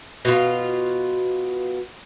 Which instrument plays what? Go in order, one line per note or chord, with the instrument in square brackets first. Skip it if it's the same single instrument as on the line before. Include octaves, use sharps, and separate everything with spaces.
[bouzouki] B2 F4